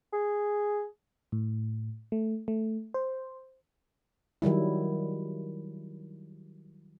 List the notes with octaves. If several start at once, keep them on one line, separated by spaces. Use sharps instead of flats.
G#4
A2
A3
A3
C5
D#3 F#3 G3 E4